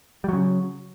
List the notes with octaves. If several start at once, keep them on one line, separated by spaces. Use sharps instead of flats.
C#3 F#3 G3